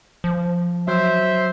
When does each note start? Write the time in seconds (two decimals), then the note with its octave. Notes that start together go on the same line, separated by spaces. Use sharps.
0.24 F3
0.88 F#3 C5 E5